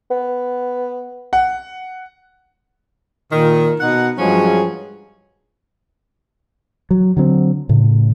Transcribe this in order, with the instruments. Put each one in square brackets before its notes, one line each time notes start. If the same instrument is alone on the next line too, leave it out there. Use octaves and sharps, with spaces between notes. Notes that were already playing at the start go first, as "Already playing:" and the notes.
[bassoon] B3
[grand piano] F#5
[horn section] A#2 D#3
B2 D#4 F#5
G2 F3 F#3 G#3 C#4 G#4
[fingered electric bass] F#3
D3 F#3 C4
[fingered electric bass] A2 [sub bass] C#3